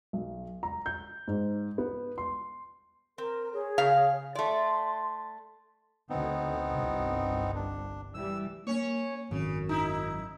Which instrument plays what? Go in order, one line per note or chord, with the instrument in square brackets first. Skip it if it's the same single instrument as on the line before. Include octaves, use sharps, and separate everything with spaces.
[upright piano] B1
A#5
G6
G#2
B3
C6
[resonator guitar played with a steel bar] C4 [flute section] A#4
[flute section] G#4 C#5
[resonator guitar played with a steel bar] C#3 F5 A#5
[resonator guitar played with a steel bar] A3 D5 [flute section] C6
[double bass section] D2 D3 [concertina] B3 C4 D#4
[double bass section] G1 C2
[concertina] D4
[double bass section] E3 G3 [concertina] E6
[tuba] A#3 [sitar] C#4 C#5
[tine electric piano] G#1 [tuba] F#2 [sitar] C#3
[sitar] D#4 E4